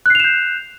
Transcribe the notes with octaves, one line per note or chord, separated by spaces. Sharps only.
F#6 G6 C7 E7 F7